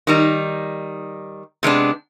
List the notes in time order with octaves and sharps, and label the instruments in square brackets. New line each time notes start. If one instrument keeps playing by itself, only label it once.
[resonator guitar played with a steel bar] D#3 G3 D#4
C3 G#3 B3 D4